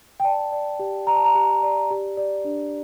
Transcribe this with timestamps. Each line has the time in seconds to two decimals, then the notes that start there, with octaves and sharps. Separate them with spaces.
0.20 G5
0.24 D5 A5
0.52 D5
0.79 G4
1.07 D5 A#5
1.16 A5
1.25 A#5
1.35 G4
1.63 D5
1.91 G4
2.17 D5
2.45 D4